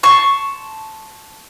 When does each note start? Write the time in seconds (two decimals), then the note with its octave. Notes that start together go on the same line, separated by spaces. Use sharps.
0.03 A5 C6 C#6